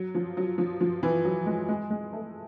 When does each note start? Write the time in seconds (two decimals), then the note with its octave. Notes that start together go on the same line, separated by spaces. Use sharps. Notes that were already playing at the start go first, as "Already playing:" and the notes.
Already playing: F#3
0.15 F3
0.37 F#3
0.58 F3
0.81 F3
1.03 E3
1.25 F#3
1.46 G#3
1.69 G#3
1.90 G#3
2.13 A3